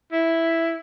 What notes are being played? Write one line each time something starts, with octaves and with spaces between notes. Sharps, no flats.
E4